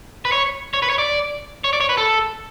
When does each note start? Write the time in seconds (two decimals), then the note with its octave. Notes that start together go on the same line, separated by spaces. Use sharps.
0.25 B4
0.32 C#5
0.73 C#5
0.82 B4
0.90 C#5
0.98 D5
1.64 C#5
1.73 D5
1.80 C#5
1.89 B4
1.97 A4